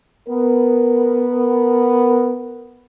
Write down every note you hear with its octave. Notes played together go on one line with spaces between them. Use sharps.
B3 A#4